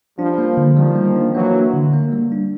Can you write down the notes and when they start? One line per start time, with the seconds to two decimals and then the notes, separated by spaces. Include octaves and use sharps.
0.19 F3 G3 D4
0.38 A#3
0.57 D3
0.76 D#3 F3 G3
0.96 A#3
1.16 D4
1.35 E3 F#3 A#3
1.54 D4
1.74 D3
1.94 A#3
2.12 G3
2.32 D4